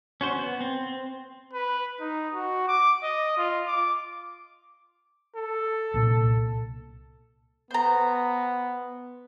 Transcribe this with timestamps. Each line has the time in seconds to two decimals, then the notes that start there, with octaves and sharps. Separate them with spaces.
0.21 C#4 F#4 C5
0.37 B3
0.61 C4
1.53 B4
2.00 D#4
2.34 F#4
2.68 D6
3.03 D#5
3.37 F4
3.67 D6
5.36 A4
5.94 C2 A#2
7.71 B3 C5 A#5